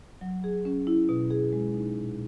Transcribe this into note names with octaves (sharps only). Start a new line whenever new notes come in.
F#3
G#4
C#4
E4
B2
G#4
G#3
D#4
A#2